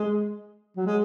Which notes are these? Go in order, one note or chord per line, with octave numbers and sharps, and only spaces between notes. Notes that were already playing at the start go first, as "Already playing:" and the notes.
Already playing: G#3
F#3
G#3